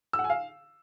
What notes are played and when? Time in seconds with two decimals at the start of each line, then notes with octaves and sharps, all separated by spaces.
0.13 E6
0.19 F#5
0.24 G#5
0.30 F5